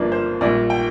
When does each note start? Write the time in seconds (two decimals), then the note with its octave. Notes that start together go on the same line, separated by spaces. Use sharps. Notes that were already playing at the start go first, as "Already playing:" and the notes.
Already playing: G1 G2 F3 A#3 D4
0.12 C5
0.41 A#1 A#2 G3 D5
0.70 G5